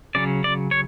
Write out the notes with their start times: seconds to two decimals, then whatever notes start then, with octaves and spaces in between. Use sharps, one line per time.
0.15 C#3 F#3 C#4 D5
0.44 D5
0.71 C#5